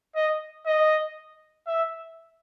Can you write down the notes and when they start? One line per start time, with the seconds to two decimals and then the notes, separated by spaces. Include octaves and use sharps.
0.15 D#5
0.66 D#5
1.67 E5